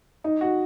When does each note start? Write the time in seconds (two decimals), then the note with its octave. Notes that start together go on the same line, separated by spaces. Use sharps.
0.24 D#4
0.41 F#4